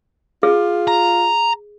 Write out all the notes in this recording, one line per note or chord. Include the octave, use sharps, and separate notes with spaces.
F4 G#4
A#5